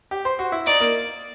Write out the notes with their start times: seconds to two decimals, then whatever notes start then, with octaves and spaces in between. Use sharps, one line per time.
0.11 G4
0.25 C5
0.39 F#4
0.52 E4
0.66 D#4 D5
0.80 A#3